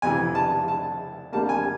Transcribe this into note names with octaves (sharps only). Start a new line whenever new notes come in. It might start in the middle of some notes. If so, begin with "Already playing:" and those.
F2 C3 E3 G#5
A5
A5
F2 D3 G3 A#3 A5
G#5